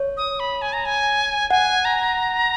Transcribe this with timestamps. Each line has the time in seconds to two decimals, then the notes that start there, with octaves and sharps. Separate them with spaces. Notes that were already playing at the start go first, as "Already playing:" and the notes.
Already playing: C#5
0.17 D#6
0.40 B5
0.62 G#5
0.73 A#5
0.85 G#5
1.51 F#5 G#5
1.85 A#5